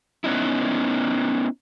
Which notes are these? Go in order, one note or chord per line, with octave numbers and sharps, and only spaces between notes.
B3 C#4 D#4 E4